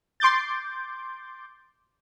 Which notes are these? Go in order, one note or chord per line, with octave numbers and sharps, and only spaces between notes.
C6 D6 G6 A6